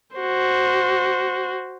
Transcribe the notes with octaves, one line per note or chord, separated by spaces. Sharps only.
F#4 C5